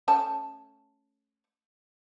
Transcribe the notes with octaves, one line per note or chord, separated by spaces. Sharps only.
A3 C#4 A5